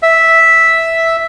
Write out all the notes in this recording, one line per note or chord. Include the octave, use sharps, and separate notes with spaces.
E5